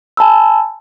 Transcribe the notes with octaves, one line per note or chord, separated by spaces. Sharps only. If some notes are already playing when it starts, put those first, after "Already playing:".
G#5 A5 B5 E6